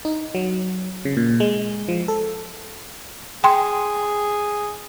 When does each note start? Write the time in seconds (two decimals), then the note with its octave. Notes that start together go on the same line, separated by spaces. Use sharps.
0.05 D#4
0.35 F#3
1.05 C#3
1.17 A#2
1.40 G#3
1.88 F3
2.08 A4
3.44 G#4 G5 C6